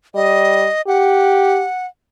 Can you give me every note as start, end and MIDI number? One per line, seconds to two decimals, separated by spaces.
0.15 0.66 55
0.15 0.82 75
0.87 1.64 67
0.87 1.86 78